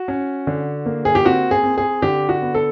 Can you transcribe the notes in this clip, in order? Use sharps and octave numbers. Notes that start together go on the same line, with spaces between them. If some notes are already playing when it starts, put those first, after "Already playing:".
Already playing: F#4
C#4
D3
A#3
G#4
G4
C4 F#4
G#4
C4
G#4
D3 G4
F#4
B3
A4